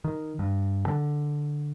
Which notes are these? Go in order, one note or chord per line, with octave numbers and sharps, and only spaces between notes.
D#3
G2
D3